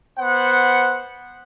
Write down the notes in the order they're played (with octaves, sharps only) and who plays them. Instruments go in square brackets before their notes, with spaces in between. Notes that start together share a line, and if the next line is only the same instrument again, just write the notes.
[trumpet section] B3 C5 F#5